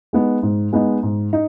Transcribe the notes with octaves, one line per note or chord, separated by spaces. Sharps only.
G#3 B3 D#4
G#2
G#3 B3 D#4
G#2
D#4